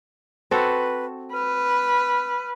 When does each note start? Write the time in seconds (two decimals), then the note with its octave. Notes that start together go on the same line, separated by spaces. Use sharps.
0.51 C4 F#4 A4 B4
1.33 B4 F6